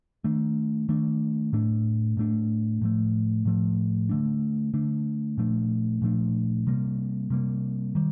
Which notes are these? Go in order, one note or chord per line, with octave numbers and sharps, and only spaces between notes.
D#3 A3 D4
D#3 A3 D4
A2 A3 D4
A2 A3 D4
A2 F3 A3
A2 F3 A3
D3 A3 D4
D3 A3 D4
A#2 F3 A3 D4
A#2 F3 A3 D4
C3 G3 A#3
C3 G3 A#3
D#3 G3